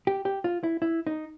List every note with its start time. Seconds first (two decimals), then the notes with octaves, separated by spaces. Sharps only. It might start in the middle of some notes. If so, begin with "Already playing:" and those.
0.07 G4
0.25 G4
0.44 F4
0.63 E4
0.82 E4
1.07 D#4